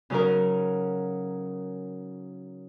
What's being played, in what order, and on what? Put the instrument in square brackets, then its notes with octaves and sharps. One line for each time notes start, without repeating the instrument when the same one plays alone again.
[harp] C#3 F#3 C#4 D#4 A#4